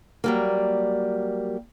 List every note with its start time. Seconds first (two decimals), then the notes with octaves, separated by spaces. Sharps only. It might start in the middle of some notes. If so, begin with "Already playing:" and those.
0.24 F#3 G3 A#3